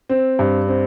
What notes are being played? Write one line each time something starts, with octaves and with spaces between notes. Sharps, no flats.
C4
G2
C4